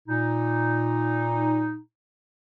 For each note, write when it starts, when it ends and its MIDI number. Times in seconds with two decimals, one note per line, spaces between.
0.08 1.79 46
0.08 1.79 63